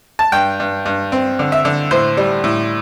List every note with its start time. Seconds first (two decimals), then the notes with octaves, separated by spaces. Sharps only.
0.19 A5
0.32 G2 G5
0.60 G2
0.85 G2
1.12 C4
1.39 D3
1.52 E5
1.65 D3
1.91 A2 C5
2.17 G3
2.44 A2